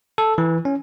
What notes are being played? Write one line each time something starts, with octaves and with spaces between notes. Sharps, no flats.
A4
E3
C#4